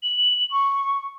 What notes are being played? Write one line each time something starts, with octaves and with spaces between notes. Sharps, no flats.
F#7
C#6